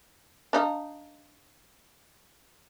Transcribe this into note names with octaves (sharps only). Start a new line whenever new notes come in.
D4 D#4 F5